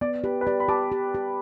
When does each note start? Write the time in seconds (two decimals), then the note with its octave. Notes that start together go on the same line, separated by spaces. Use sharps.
0.01 B3 D5
0.24 G4 B4
0.41 B4
0.46 G4 D5
0.60 B5
0.68 G4 A5 D6
0.92 G4
1.15 G4